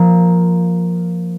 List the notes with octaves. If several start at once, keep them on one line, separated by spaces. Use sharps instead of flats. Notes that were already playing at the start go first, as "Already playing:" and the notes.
Already playing: F3 A#3